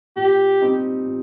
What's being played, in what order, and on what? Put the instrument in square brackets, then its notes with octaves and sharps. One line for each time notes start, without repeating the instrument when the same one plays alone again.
[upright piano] A#2 [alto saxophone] G4
[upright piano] G3 C4 D#4
A#2